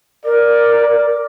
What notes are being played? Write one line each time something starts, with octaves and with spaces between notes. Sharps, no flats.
A#4 D5